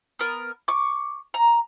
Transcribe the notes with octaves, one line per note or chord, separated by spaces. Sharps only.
B3 A#4
C#6 D6
A#5